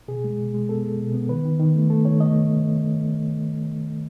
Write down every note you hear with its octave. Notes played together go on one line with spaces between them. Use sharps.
B2 G#4
G#3
B2
G#3
B3 A4
G#3
B2
B3
D#3 B4
D#3
D#3
A3
A3 A4
D#3 C#5
A3 D#5